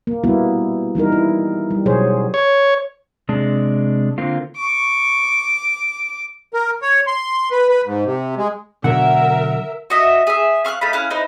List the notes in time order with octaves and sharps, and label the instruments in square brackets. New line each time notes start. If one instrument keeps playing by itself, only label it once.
[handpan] A#3
G3 A#3 B3 E4 F#4
E3 G3 D#4 A#4
E4
G3
B2 F#3 G#4 C5 C#5
[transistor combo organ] C#5
[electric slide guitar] C3 G#3 D4
D3 A#3 C4 F4
[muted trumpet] C#6 [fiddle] D6
[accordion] A#4
C#5
C6
B4
B4
G#2
C3
G#3
[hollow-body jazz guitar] B2 D3 F#3 [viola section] A#4 E5 [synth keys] F#5
[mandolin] F#4 D#5 E5
G#4 E5
F5 C#6 F6 F#6
A3 D#4 F5 B5
C#4 E4 F5 F#6
D#4 E4 B4 C5